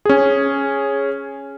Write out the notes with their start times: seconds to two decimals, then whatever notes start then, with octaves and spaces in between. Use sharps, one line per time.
0.05 C#4 G#4